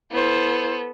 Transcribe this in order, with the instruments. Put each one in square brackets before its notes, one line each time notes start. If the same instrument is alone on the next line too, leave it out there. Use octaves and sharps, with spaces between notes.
[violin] B3 A4 [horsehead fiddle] E4 C5